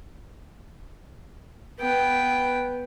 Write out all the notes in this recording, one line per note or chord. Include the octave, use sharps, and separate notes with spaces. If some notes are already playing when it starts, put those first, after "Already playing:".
B3 G5